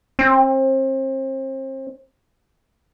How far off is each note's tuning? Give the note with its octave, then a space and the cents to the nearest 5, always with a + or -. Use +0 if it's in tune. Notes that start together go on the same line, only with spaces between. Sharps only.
C4 +35